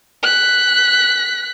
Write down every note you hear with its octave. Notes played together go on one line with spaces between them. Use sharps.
F#6 B6